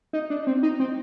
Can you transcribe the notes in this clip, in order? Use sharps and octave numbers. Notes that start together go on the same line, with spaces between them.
D#4
D4
C4
D#4
C4